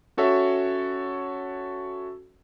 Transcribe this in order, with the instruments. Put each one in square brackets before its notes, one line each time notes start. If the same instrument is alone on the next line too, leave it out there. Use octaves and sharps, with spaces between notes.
[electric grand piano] C#4 F#4 A4 C#5 E5